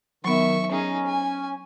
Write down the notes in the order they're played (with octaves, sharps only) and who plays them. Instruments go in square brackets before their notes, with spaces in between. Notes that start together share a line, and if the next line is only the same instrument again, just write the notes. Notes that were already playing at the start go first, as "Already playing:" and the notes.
[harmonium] D#3 [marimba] F#3 B3 [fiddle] E5 C#6
[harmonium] C#4 [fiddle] D#4 G#4
[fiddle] G#5